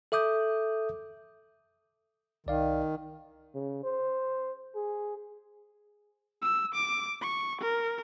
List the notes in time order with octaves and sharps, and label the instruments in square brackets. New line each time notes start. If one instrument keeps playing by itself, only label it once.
[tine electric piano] A4 E5 D6 D#6 G6
[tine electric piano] C2 D5 F5 [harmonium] D#3
[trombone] C#3
C5
G#4
[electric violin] E6
D6
C#6
A#4